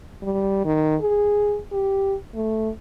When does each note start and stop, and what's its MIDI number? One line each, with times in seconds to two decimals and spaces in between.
0.23 0.65 55
0.65 0.96 51
1.01 1.59 68
1.72 2.15 67
2.35 2.69 57